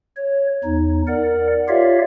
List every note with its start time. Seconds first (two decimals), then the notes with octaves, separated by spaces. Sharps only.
0.16 C#5
0.64 E2 D#4
1.07 A#4 D5 F#5
1.68 F4 G4 C#5 D5 E5 F5